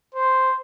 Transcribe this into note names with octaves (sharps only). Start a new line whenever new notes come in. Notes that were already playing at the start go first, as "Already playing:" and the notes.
C5